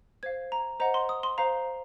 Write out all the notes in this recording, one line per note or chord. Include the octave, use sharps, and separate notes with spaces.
C5 F5 G#6
A#5
C5 D#5 F#5 A#5
C6
D#6
C6
C5 F5 A#5